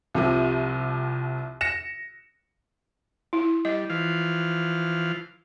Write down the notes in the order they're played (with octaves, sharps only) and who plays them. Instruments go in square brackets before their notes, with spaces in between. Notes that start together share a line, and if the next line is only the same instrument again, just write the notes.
[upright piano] C2 C3 F3
A#6 C#7 E7
[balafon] E4
[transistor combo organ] G3 [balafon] D#5
[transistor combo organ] E3 F3 F5